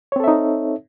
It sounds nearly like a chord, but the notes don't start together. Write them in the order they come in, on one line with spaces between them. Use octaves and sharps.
C#5 C4 A4 E5 D#4